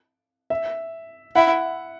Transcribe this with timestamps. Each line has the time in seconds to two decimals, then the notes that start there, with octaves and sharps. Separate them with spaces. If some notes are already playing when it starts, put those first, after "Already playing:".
0.50 E5
1.35 E4 F#5